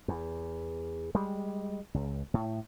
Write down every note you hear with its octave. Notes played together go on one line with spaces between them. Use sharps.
E2
G3 G#3
C#2
A2